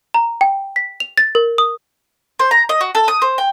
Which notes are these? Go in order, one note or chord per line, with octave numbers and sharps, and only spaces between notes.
A#5
G5
B6
F7
A6
A#4
D#6
C5
A#5
D#5
F#4
A4
D#6
C5
G5